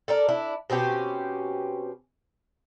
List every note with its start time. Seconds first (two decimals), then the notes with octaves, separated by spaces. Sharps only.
0.08 A4 A#4 D5
0.29 D4 E4
0.70 B2 C4 C#4 G4